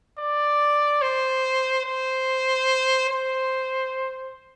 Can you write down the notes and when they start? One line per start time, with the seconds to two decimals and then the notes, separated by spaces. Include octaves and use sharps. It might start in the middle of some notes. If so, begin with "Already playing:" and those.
0.19 D5
1.02 C5
1.85 C5
3.10 C5